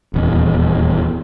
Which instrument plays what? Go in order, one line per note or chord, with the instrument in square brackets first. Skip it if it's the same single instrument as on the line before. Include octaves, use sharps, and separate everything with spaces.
[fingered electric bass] D#1 E2